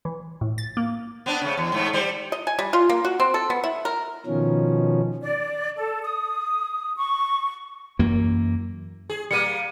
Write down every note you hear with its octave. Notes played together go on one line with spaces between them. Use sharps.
E3
A2
A6
A#3
B3 C4 D4
C#3 A3
E2
G#2 A3 B3
G3 C5
D#5
G#5
G3
F4
A#3
F#4
C4
A4
B3
E4
A#4
B2 D#3 F3 C#4
D5
A4
D#6
C#6
F#2 E3 A#3
G#4
G3 A#3 C#7 D#7